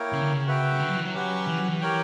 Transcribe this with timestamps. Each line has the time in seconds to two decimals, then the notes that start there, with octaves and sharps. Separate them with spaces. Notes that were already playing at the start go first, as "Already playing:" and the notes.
Already playing: A#3 E4 A#4 C#5 G5
0.13 C#3
0.21 D3
0.30 C#3
0.46 F#4 B4 E5 G5
0.73 C#3
0.80 D3
0.88 F#3
0.97 E3
1.05 F#3
1.13 C#4 G4 B4 F#5
1.47 E3
1.58 F#3
1.69 E3
1.81 G4 A#4 C#5 G5